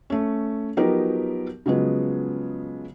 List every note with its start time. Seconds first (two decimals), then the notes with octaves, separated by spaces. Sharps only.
0.10 A3 C#4
0.77 F3 F#3 B3 D#4 G4 A#4
1.66 C#3 F3 F#3 G#3 B3